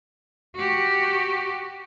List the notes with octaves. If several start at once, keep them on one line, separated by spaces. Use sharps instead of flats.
F#4 G4